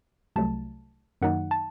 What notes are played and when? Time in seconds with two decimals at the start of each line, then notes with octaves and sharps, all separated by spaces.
0.36 C2 C3 F#3 A3 A5
1.22 F#2 D#3 F#3 A#3 D#4 F#5
1.51 A5